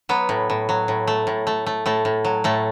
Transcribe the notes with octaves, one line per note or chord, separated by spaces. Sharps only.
F#3 B3
A2
A2
F#3
A2
A3
A2
A3
A3
A2 A3
A2
F#3
A2 A3